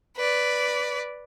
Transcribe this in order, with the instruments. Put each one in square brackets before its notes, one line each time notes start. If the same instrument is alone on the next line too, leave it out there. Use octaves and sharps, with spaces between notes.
[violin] B4 D5